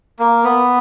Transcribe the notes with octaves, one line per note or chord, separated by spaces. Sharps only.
A#3
B3